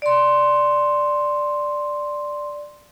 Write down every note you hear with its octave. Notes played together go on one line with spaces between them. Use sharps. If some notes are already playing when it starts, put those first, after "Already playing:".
D5 C6